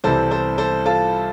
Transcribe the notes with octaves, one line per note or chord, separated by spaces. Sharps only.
C2 C3 E3 G3 A4 C5
A4 C5
A4 C5
F4 A4